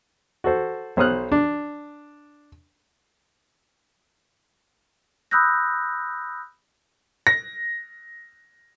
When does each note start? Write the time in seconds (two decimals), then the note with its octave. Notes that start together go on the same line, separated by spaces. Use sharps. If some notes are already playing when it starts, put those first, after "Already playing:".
0.44 F#4 A4 C5
0.97 B1 C5 C#5 D#6 F6 F#6
1.32 D4
5.31 B5 D#6 E6 F#6 G6 A#6
7.27 A#6